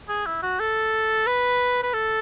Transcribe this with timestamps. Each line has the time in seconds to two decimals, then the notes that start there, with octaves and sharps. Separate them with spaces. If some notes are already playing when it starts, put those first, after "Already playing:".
0.09 G#4
0.26 E4
0.42 F#4
0.60 A4
1.27 B4
1.83 B4
1.94 A4